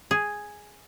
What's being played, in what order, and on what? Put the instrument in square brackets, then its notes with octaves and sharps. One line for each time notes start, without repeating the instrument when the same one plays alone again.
[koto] G#4